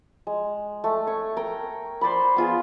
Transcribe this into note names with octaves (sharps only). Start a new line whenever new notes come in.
G#3
A3
C#5 C#6
A#4 G5
C5 D5 B5
B3 F4 G#4